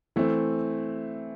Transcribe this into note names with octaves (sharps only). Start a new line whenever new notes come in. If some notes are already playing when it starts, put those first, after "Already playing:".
E3 A3 C4